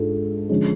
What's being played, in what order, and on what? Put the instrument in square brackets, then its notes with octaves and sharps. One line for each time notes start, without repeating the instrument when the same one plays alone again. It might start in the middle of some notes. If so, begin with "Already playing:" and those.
Already playing: [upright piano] G#2 G#3 D4 F4 A4
D3 F3 G#3 C#4